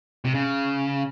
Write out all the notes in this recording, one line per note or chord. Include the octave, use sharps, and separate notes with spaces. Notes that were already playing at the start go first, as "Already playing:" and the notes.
C3
C#3